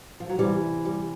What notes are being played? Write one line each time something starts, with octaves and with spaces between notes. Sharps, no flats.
F3
F#3
E2 C3 E3 G3
G3